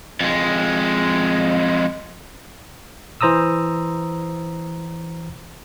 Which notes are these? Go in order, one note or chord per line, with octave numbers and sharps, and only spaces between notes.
F2 G#3
E3 C5 A#5 D#6 E6